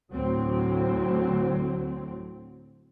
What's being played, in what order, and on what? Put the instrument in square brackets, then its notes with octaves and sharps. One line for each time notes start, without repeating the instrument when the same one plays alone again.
[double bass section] D2 A2 D3 F#3 C4